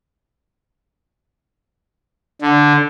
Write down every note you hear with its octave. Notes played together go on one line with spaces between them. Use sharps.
D3